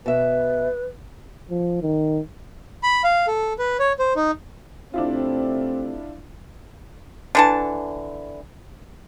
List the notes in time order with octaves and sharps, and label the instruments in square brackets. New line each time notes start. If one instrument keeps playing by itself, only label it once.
[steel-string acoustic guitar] B2 E5 [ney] B4
[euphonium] F3
D#3
[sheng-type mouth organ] B5
F5
A4
B4
C#5
C5
D#4
[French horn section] C3 A3 C4 [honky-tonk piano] D4 E4 F4
[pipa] D3 E3 A5